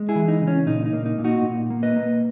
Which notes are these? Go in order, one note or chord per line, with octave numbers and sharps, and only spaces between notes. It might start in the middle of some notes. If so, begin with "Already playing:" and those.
Already playing: G#3
E4 G#4
E3
D#4
C#3
C#4
A#2 D#4
D#4
A#3
D#4
A#2
D#4 F#4
A#2
A#3
B4 D#5
A#3